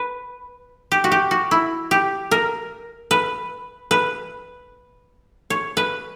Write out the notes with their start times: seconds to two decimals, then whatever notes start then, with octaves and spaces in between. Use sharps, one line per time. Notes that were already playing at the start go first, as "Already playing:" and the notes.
Already playing: B4
0.92 G4
1.04 F#4
1.12 G4
1.31 F#4
1.51 E4
1.91 G4
2.31 A#4
3.11 B4
3.91 B4
5.50 C#5
5.77 B4